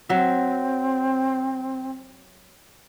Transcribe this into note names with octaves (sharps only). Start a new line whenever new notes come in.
F#3 C4 E5